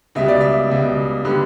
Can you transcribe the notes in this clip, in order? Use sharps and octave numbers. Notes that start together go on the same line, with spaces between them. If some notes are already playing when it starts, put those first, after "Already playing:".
C#2 B2 G3 E5
D5
E5
C#2 B2 G3
D3 G3 B3